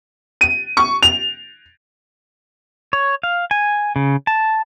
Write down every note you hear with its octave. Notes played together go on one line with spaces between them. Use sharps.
D#7
C#6
F7
C#5
F5
G#5
C#3
A5